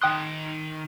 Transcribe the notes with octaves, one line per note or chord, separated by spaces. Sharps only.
D#3 G5 C6 D#6 F#6